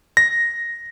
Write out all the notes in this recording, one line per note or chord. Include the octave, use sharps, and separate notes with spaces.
A#6